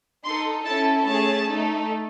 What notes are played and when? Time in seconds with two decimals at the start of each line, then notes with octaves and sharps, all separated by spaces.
0.24 D#4 A4 C6
0.65 C#4 E4 A4 A5
1.06 A3 C#4 G#4 A5
1.47 A3 D#4 A4